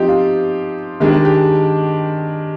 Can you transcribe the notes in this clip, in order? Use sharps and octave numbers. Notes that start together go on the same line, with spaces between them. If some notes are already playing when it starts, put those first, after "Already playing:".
Already playing: F3 C4 D#4 G4
F4
D#3 G#3 D4 G4
G4
G4